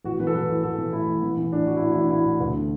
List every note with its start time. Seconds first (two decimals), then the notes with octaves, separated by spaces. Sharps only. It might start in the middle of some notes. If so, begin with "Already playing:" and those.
0.04 A1 F#4
0.20 E3 B4
0.27 A4
0.34 E3 B4
0.49 A1
0.63 A1 A4
0.78 E3
0.93 A2 E4
1.07 A1
1.23 E3
1.37 E3
1.52 A2 D4
1.67 A1 F#4
1.77 E4
1.81 A2 F#4
1.92 E4
1.96 A1 D4
2.11 A2 E4
2.25 A1
2.40 D2
2.54 D3